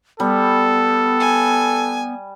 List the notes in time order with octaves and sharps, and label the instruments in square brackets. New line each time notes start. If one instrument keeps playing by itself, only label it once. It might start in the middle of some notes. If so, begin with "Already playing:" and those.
[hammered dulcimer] G3 [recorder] B3 [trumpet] A4
[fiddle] G#5